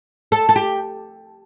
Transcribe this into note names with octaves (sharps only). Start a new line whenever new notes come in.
A4
A4
G4